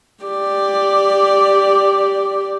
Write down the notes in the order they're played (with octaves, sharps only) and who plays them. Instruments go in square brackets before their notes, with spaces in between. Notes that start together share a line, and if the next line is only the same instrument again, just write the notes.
[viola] G4 D5